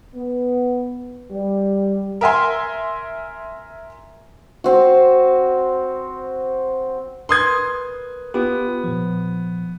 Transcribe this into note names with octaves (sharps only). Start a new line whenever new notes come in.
B3
G3
A#4 E5 G#5 C6
C4 F#4
A#4 B4 C6 D#6 F#6 G#6
B3 F4 G4
A#2 F3